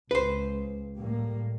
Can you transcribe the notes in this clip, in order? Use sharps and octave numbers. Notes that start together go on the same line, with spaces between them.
C#2 B4 C5
A2 G3 A#3